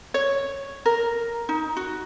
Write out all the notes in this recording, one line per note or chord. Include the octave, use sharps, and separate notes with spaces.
C#5
A#4
D#4
F#4